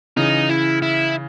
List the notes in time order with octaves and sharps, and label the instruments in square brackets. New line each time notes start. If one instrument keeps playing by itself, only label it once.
[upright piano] C#3 E3 [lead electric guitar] D#4
[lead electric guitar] E4
E4